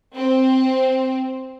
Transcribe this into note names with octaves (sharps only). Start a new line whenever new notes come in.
C4